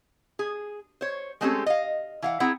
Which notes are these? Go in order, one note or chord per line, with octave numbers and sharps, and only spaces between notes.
G#4
C5 C#5
G#3 A3 C4 C#4 G4 A4
D#5 F5
E3 F5 F#5
C4 E4 G#4 F#5 A#5